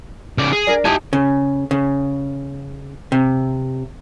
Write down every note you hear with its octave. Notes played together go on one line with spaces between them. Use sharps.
C#3 D5
G#4
D4 A#4 D5
D#4 E4 G4 G#5 A5
C#3
C#3
C3